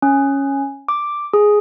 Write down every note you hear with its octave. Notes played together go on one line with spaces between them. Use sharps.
C#4
D6
G#4